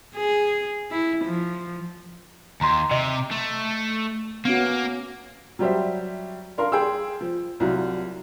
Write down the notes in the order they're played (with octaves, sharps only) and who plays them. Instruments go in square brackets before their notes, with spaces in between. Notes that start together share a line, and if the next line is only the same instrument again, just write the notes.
[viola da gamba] G#4
E4
F3
[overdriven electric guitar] D#2 [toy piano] A#5 C6
[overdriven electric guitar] C3 [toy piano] D#5
[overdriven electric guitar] A3
[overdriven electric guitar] A#3 [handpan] B3 C#4 F#4
[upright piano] F#3 G3 G4 C5 E5
D4 A#4 F5 C6
G#4 G5 C6 E6
F3
C2 F#3 G3 F4